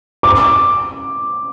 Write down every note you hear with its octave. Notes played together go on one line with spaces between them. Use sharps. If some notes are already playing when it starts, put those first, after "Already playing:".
D6